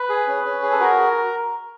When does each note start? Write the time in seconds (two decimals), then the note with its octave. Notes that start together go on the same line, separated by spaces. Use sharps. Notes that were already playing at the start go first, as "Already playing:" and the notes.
Already playing: B4
0.09 G#4
0.27 C#4
0.44 C#4
0.62 G#4
0.71 A4
0.80 F#4 A#4